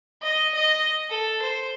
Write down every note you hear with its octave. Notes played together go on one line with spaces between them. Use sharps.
D#5
D#5
A4
C5